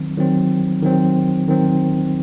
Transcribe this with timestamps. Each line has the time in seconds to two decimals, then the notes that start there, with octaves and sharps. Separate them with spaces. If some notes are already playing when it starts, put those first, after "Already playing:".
Already playing: D#3 F#3 C4
0.17 D#3 F#3 C4
0.83 D#3 F#3 C4
1.48 D#3 F#3 C4